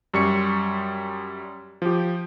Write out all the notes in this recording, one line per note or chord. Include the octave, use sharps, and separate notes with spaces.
F#2 G3 C#6 C#7
F3 G4